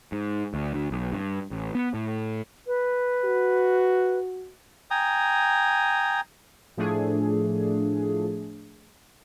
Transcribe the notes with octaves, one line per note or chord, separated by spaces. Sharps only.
G#2
D2
D2
B1
G2
A1
B3
A2
B4
F#4
G5 G#5 A#5 D#6
A2 F3 A3 D4 G#4